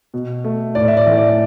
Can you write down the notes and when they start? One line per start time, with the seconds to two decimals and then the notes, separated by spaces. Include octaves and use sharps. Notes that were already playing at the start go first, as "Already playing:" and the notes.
0.14 B2
0.44 A3
0.75 A2 D5
0.88 E5
0.97 D5
1.06 E3 A3
1.18 D5